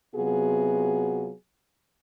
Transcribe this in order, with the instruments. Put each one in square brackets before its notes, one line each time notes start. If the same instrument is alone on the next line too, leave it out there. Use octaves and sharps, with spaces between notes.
[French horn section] C3 F#3 B3 F4 F#4 G#4